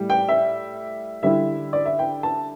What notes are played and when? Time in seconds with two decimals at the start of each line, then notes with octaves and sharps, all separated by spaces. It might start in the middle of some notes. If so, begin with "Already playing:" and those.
Already playing: A2 G3
0.10 G5
0.29 E5
1.23 D3 G3 E4 E5
1.73 D5
1.86 E5
1.99 G5
2.23 A5